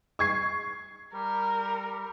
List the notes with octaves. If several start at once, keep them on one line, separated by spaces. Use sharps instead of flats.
C#6 G#6 C7
G3 A#4